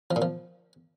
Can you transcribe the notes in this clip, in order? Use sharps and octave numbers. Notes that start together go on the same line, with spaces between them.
F3
A#2
F3